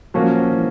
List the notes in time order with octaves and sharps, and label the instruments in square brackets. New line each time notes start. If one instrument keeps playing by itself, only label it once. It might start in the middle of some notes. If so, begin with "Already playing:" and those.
[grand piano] A#2 F#3 A#3 C#4 F#4 [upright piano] F3
[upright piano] E3